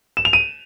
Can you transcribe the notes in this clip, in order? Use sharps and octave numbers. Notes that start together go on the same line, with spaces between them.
E7
F7
D#7